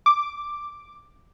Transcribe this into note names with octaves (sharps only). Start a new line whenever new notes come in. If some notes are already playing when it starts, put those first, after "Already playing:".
D6